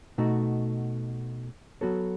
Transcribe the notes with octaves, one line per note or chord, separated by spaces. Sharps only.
B2 A3 D#4 F#4
F#3 B3 F#4 A4 C#5